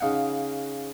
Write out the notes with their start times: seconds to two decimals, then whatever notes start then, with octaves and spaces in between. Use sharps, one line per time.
0.01 C#3 D#4 F5 F#5